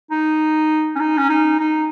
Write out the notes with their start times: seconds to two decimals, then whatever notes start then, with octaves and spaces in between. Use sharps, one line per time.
0.11 D#4
0.96 C#4
1.00 D#4
1.17 C#4
1.29 D#4
1.59 D#4